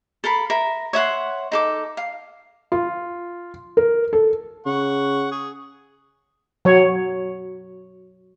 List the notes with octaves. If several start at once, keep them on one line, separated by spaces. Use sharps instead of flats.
A4 A#4 F5 B5
A#4 E5
C#5 E5 F#5 C6
D#4 A4 D6
F5
F4
A#4
A4
C#3 F#5 C#6
G#4
F#3 C#5